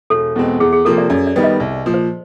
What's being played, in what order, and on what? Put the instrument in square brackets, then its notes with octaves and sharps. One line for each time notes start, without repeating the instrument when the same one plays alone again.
[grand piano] E1 [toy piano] A4
[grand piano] E2 B2 G#3 C4
[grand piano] E2 [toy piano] G#4
[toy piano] G#4
[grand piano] C3 F3 A#3 [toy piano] A4
[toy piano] D5
[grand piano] F#2 [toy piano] D5
[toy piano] D5
[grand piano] D#3 G3 B3
[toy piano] D#5
[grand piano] C2 [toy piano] D5
[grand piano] A#2 F3
[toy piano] C5